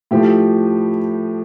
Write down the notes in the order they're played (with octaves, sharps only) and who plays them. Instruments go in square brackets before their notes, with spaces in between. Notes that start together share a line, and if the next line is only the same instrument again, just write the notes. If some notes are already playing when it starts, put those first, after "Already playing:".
[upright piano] A2 F3 G4